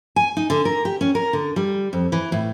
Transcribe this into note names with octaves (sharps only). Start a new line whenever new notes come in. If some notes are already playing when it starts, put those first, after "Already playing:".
G#5
D#4
D3
A#4
G4
C#4
A#4
D3
G3
F2
E3
A2